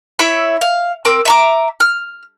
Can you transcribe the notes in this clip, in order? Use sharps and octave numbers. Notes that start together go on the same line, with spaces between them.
E4 C#5 E5 B5
F5
C4 A#4 D6 E6
E5 A#5 D6
F6